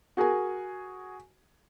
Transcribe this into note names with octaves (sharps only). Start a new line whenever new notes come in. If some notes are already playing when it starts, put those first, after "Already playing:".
F#4 G#4 A#4 G#5